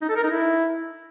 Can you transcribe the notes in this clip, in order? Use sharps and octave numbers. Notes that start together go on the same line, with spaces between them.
D#4
A4
A#4
D#4
E4